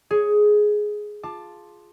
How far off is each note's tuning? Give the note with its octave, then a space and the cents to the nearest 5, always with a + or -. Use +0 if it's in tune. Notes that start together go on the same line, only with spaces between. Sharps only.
G#4 +10 C#5 +0
F4 +0 A5 +0 D6 +20